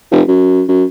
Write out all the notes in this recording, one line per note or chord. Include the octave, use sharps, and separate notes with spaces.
F1
F#2
F#2